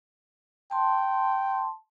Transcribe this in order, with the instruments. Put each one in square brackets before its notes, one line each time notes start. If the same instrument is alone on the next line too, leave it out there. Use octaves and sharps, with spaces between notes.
[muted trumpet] G5 [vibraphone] A5 C6